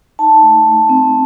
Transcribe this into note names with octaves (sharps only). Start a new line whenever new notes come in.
D#4 A5
A3
A3
C4